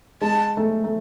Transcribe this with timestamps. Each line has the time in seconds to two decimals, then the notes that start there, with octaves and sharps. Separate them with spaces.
0.21 G#3 A5
0.57 A3
0.84 A3